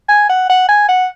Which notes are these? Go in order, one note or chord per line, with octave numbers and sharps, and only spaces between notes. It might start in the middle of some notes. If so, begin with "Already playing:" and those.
G#5
F#5
F#5
G#5
F#5